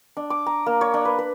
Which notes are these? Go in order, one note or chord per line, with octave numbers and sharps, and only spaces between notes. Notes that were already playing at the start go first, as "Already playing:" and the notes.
D4
D6
A#5
A#3
C#5
D4
B4
B4